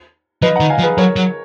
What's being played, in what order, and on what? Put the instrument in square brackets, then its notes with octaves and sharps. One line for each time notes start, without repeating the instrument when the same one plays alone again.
[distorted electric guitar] F3 [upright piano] B4 D#5
[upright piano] F#5 A#5
[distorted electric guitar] D#3
[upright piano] F5 G#5
[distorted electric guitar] F3
[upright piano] G#4 B4
[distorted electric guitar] F#3 [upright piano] A#4 C#5
[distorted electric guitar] F#3